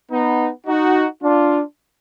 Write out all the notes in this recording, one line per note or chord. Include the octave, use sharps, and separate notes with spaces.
B3 D#4
D#4 F#4
D4 F4